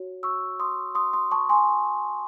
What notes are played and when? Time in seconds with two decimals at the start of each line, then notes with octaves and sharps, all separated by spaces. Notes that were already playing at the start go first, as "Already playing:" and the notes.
Already playing: F#4 C#5
0.23 C#6 E6
0.60 C6 D#6
0.95 C6 D#6
1.13 C6 D#6
1.31 A5 C#6
1.49 G#5 C6